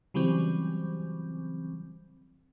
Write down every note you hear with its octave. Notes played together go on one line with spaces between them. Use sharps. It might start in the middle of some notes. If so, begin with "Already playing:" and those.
C#3 E3 F#3 G3 C4